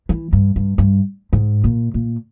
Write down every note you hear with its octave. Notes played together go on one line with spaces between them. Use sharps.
E3
G2
G2
G2
G#2
A#2
A#2